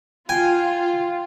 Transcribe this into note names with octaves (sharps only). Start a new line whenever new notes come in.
F4 G5 G#5